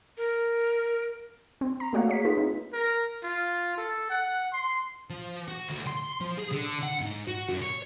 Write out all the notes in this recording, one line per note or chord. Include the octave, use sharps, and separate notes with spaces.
A#4
C4
A#5
A3 A#3 F#4 C#5 F5 F#5
G#4 C#5 B6
D#4 F4 G#4 B4
C4 D#4
A#4
F4
A4
F#5
C6
F3
F#4
D2
C6
F3
G#4
D3
F#5
G#2
F#4
F#2
C#5